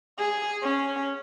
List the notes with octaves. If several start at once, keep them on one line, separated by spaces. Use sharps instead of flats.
G#4
C#4